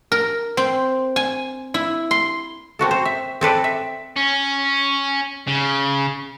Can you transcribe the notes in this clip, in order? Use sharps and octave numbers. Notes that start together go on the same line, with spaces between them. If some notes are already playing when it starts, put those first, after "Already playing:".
A#4
C4
G#5
E4
C6
A#3 C4 F#4 A4
C5
E5
C4 A4 B4 D5
E5
C#4
C#3